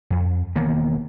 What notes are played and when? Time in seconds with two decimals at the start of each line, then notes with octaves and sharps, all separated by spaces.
0.10 F2
0.56 E1 D#3 A#3 B3